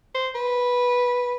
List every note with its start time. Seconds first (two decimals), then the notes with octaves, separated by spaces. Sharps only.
0.15 C5
0.35 B4